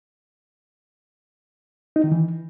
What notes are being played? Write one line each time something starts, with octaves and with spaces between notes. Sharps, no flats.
D#4
D#3
E3